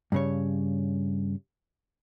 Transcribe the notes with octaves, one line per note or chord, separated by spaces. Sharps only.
G2 C#3 C#5